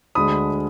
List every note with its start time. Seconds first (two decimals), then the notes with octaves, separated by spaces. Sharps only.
0.15 D2 D3 G#3 B5 D#6